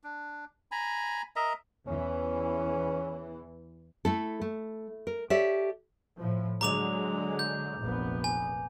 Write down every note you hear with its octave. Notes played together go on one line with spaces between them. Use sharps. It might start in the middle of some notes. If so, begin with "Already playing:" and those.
D4
G#5 A#5 B5
A#4 D#5 E5 A#5
E2 E3 C#4
A3 E4 A4
A3
A#4
G4 A4 C#5 D5 E5
A2 F3
D3 F#3 G#3 A#5 D6 F7
G6
F1 A#1 B3
G#5